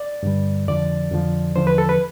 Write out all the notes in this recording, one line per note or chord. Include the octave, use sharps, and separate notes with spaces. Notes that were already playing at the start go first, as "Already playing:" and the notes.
Already playing: D5
G2 D3 G3
F2 D3 F3 D5
F2 D3 F3
E2 D3 F3 C5
B4
A4
B4